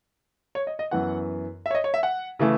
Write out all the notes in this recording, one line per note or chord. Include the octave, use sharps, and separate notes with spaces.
C#5
D#5
D#5
F#2 E3 B3 F#5
E5
C#5
D#5
C#5
E5
F#5
C#3 E3 A3